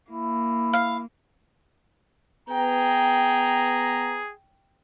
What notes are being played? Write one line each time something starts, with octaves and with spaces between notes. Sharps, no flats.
A#3 E4
F5
B3 G#4 G5 A#5